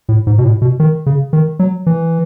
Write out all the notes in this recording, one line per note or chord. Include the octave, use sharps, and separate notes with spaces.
A2
G#2
B2
A2
B2
D#3
C#3
D#3
F#3
E3